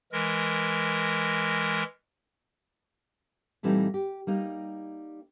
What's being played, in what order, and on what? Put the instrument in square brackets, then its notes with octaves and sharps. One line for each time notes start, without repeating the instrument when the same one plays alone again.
[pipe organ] E3 G#3 A#4 A#6
[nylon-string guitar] A#2 E3 G3 A3 C4 D#4
G4
G3 A#3 D#4